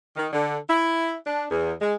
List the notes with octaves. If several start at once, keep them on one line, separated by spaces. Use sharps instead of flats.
D#3
D3
E4
D4
E2
G#3